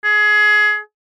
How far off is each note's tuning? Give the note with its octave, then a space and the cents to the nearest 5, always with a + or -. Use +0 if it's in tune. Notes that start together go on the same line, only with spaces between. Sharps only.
G#4 +20